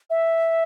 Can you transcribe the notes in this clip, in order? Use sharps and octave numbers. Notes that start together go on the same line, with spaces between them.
E5